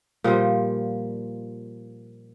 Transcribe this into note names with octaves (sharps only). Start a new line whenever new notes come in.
A#2 F3 G3